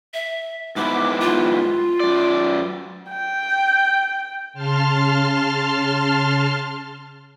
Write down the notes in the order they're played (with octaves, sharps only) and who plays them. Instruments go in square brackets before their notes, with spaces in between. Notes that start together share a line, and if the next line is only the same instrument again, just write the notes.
[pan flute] E5
[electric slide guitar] G#2 B3 E4 [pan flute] D6
[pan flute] F4
[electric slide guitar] F#2 D5
[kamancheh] G5
[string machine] C#3 A5 C6 F6